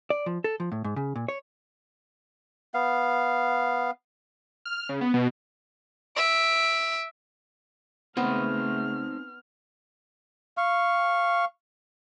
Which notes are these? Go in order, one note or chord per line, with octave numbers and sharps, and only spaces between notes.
D5
F3
A4
F3
A2
G#2
C#3
A#2
C#5
B3 F5
F6
C#3
B3
B2
E5 D7
C#3 A3 B3 C4 D#4 C5 F6
F5 C#6